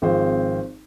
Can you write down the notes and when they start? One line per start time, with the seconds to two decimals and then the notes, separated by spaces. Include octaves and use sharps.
0.02 G#1 F3 C4 G#4 C5 F5